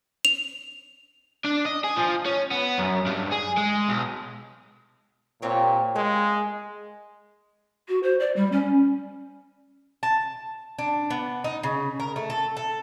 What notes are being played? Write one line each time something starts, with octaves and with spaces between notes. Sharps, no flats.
F7
D4
D#5
G#4
F3
C#4
B3
F#2
G2
G#4
G#3
B1
A#2 C4 G4 C#5
G#3 A#3
F#4
C5
D5
G3
C#4
A5
D4
B3
D#4
C#3
A#4
A3
A4
A4